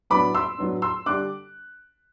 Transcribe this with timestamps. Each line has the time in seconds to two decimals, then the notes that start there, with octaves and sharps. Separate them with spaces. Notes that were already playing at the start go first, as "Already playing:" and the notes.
0.10 A2 F#3 B3 D4 B5 D6
0.35 C6 E6
0.58 A2 F#3 B3 D4
0.82 C6 E6
1.06 D3 G3 D4 D6 F#6